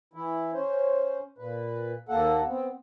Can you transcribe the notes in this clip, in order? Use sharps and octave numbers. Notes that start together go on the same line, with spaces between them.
E3 E4
C#4 C5
A#2 B4
D#2 A#3 A4 F#5
B3 C4